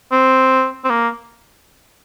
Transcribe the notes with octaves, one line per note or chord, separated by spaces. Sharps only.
C4
C4
A#3